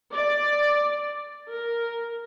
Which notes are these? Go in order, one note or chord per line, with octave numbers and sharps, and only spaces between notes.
D5
A#4